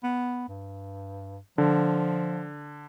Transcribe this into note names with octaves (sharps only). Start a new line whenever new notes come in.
B3
G2
D3 F3